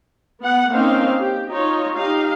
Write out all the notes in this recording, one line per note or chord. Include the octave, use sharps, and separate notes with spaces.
B3 F#5
A#3 C4 C#4 D#4 C5 F5
G4
D#4 F4 C#5
D#4 G4 F5